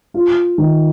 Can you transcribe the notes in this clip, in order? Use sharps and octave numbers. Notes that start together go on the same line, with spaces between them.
F4
D#3